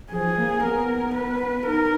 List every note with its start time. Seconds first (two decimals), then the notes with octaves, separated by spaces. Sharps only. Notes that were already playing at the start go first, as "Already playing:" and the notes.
0.11 F3 G#4
0.38 A#3
0.64 B3 A#4
1.15 B4
1.67 D#4 A#4